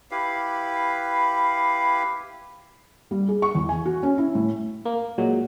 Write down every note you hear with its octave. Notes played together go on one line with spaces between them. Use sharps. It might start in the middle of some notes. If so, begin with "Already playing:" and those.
E4 G4 B4 F5
G3
G#4
C#6
E2
G#5
F#4
C#4
E4
A2
A#3
A#2 F#3 G#3